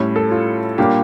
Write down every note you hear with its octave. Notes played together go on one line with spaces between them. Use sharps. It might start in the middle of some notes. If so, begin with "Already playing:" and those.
Already playing: A2 G3 C#4 E4 C#5
A4
F4
A#2 G3 A#3 D4 G4